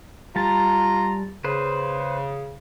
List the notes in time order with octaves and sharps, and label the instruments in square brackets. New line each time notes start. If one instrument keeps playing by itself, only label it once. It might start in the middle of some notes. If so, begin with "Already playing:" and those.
[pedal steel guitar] G3 A5 [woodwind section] F4 A#5
[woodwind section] C#3 [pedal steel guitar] B4 C5